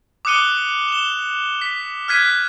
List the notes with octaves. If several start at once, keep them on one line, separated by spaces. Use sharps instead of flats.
D6 D#6 F#6 C#7 D#7 G7
E7 G7
B6
F6 F#6 G#6 B6 D#7